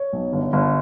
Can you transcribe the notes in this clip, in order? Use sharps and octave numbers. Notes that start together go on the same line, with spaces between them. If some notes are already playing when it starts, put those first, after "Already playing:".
Already playing: C#5
B1
G1
G1